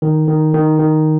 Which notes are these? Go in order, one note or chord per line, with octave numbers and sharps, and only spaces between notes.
D#3
D#3
D#3
D#3